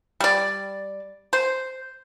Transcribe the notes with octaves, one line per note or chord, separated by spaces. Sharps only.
G3 D5
C5